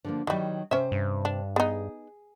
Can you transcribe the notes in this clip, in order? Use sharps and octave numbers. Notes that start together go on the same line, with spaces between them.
D3 F3 A#3
D#3 E3 F#3 G3
C3 C#4 C5 E5
G2
D4
B3 D#4 G#4